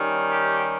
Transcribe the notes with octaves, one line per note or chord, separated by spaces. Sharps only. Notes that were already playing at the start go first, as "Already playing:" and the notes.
Already playing: D#3 G3 C#4
G4